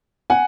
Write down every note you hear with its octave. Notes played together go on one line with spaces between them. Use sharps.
F#5 G#5